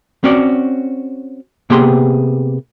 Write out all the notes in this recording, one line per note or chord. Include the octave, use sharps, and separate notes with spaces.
C4 C#4 F#4 D5
C3 A#3 B3 G4 G#4 C6